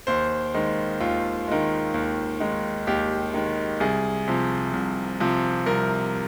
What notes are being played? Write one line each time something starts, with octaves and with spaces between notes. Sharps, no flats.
D#2 C5
D#3 G#3
D#2 F4
D#3 G#3
D#2
D#3 G#3
D#2 G4
D#3 G#3
C2 G#4
C3 F3
C2
C3 F3
C2 A#4